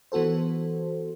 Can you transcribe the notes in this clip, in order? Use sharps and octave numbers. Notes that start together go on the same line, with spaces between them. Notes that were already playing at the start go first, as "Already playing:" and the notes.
E3 B3 F#4 A4 C5